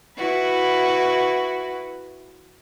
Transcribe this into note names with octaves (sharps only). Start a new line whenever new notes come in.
E4 F#4 B4